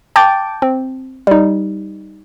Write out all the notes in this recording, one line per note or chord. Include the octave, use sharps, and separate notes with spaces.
G5 A5 D6 G6 A6 D7
C4
G3 D#4